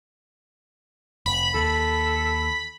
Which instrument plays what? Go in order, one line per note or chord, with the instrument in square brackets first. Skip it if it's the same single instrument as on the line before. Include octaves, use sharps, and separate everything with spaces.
[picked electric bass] F1 [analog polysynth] B5
[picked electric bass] D#2 [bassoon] A4